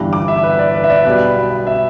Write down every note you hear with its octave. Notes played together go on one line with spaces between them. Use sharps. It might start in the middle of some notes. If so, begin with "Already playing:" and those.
Already playing: G1 G2 E3 G3 D4
D6
E5
B4
D5
B4
E5
D5
B1 B2 G3 B4
E5